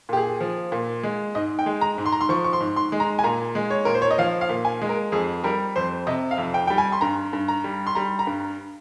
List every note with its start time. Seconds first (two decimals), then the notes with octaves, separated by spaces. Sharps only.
0.09 A#2 G4
0.17 G#4
0.40 F3
0.72 A#2
1.03 G#3
1.35 G#2 D#5
1.59 G5
1.66 G#3
1.81 A#5
1.98 G#2
2.06 C6
2.12 A#5
2.21 C6
2.29 F3 C#6
2.44 C#6
2.53 C6
2.60 G#2
2.76 C6
2.92 G#3
3.00 A#5
3.19 G#5
3.24 A#2 A#5
3.55 G#3
3.71 C#5
3.85 A#2 A#4
3.95 C5
4.02 C#5
4.11 D#5
4.18 F3 F5
4.41 F5
4.49 A#2
4.65 G#5
4.82 G#3
4.89 A#4
5.12 F2 G#4
5.44 G3 A#4
5.76 F2 C5
6.07 C3 D#5
6.31 F5
6.38 F2
6.54 G5
6.67 G3 G5
6.78 G#5
6.92 C6
7.01 G2 A#5
7.33 G2
7.48 A#5
7.64 G3
7.87 C6
7.95 G3 A#5
8.19 A#5
8.27 G2